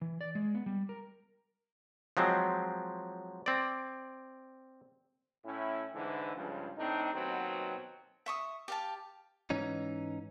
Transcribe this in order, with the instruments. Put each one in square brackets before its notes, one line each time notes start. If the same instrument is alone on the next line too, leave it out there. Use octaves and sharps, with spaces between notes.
[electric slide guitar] E3
D5
G#3
B3
G3
A#4
[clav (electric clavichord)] F3 F#3 G#3 C4
C4 D5
[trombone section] A2 C#4 E4
G#2 D3 E3
C#2 G2 F3
A2 C4 D4 D#4
D#2 B2 F#3 B3 C4
[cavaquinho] E5 C#6 D#6
G4 F5 A5
[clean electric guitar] G#2 E3 C#4 D#4